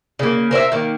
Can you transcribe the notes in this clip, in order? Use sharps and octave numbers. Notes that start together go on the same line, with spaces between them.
C#3 A#3
A#4 C5 D5 E5
D#3 A#3